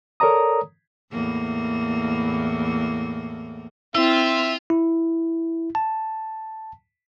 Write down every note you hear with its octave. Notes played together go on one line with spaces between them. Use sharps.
A4 A#4 C#5 D5 A#5 D#6
E2 A2 A#3
C4 E4 F4 E5
E4
A5